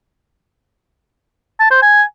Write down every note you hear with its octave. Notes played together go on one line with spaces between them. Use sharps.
A5
C5
G#5